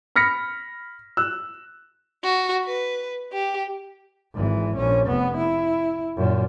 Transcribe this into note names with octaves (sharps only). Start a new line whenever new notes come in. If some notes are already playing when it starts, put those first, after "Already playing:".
B5 F6 A#6 B6 C#7
E6 F#6
F#4
B4
G4
G#1 E3
A#1 C#4
F1 B3
E4
F#2 A#2